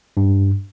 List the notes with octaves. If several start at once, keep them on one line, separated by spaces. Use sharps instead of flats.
G2